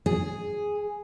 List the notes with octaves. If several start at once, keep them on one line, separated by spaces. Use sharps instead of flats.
G#4